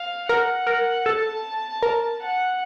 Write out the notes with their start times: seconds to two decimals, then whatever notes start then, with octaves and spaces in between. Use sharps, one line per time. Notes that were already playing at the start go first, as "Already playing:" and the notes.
Already playing: F5
0.29 A#4 F#5
0.67 A#4
1.06 A4 A5
1.83 A#4
2.21 F#5